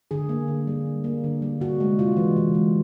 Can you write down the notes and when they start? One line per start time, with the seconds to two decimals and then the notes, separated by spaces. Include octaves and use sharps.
0.11 D3 G#4
0.29 A#3
0.48 D3
0.67 G3
0.85 D3
1.04 A#3
1.24 D3
1.42 G3
1.60 C3 F#4
1.80 G#3
1.99 C3 F4
2.17 E3
2.36 C3
2.54 G#3